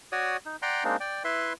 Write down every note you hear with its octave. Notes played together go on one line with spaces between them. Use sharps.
F#4 C#5 D5 D#6
D#4
D5 F#5 G5 A#5 C6
G#3 A#3 C4 D4 D#4
D5 G5
E4 B4 E5 C6